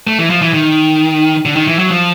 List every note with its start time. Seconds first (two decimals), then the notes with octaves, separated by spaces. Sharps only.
0.07 A3
0.19 E3
0.30 F3
0.42 E3
0.53 D#3
1.45 D3
1.56 D#3
1.67 E3
1.79 F#3
1.91 F3